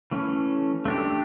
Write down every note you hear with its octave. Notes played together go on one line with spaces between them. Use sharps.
E3 A3 C#4
A3 D4 G4